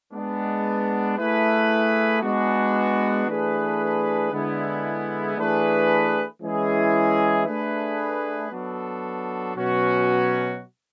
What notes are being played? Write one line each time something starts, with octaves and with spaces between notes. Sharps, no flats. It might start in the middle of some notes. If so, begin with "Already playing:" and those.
G#3 B3 D4
A3 E4 G#4 B4
G#3 B3 D4 F#4
E3 A3 D4 G#4 B4
D3 G#3 B3 E4
E3 A3 D4 G#4 B4
E3 G#3 C#4 E4 G#4
A3 D4 G#4 B4
F#3 B3 D4 F#4 A4
B2 F#3 C#4 F#4